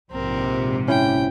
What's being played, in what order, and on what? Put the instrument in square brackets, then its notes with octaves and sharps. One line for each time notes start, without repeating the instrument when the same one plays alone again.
[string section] A#1 G#2 C3 [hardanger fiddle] C4 A#4
[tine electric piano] C#4 E4 [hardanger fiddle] G5